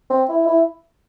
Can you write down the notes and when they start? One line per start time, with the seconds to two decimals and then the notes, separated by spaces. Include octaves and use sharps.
0.10 C4
0.29 E4
0.47 E4